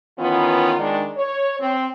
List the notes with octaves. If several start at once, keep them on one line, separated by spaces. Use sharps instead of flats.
D#3 E3 B3 C#4 F4
D#3 G#3 D4
C#5
C4